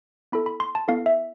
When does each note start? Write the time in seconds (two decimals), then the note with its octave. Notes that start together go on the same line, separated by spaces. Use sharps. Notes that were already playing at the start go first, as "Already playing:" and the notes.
0.32 B3 E4 A4 B5
0.46 B5
0.60 C6
0.75 A5
0.88 B3 E4 A4 F5
1.06 E5